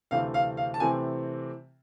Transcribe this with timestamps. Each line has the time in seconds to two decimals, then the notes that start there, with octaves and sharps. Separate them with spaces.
0.11 D2 C3 E3 A3 C4 F5
0.34 F5
0.57 F5
0.74 A5
0.80 C3 E3 A3 C4 G#5